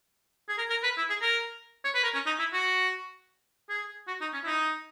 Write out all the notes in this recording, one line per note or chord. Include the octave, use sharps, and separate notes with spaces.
G#4
A#4
A#4
B4
E4
G#4
A#4
C#5
B4
A#4
C#4
D#4
E4
F#4
G#4
F#4
D#4
C#4
E4
D#4